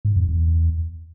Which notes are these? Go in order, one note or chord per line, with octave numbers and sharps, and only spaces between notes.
G#2
F2
E2